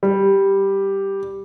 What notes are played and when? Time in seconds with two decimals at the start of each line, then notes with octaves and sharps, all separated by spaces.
0.03 G3